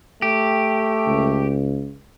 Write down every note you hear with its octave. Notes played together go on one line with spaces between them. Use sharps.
A3 G4
C#2